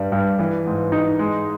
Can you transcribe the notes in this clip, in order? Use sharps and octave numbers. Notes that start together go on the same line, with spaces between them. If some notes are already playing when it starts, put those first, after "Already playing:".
Already playing: G2 G3
G2
E3
G#2
D#4
G#3